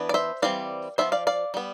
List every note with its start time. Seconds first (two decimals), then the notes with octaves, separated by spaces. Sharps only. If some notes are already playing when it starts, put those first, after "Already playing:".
Already playing: E3 B3 D4
0.09 D5
0.14 C5 E5
0.42 E3 G3 C4 D5 F5
0.98 F3 B3 D4 C5 E5
1.12 D5 F5
1.27 D5 F5
1.54 G3 B3